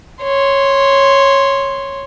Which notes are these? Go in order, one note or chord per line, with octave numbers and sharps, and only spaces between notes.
C#5 C6